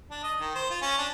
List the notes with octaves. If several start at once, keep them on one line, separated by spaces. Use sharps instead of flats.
D4
D#5
D#3
C5
F4
C#4
D4